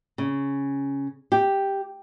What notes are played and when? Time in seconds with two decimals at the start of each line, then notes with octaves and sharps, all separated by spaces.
0.18 C#3
1.32 G4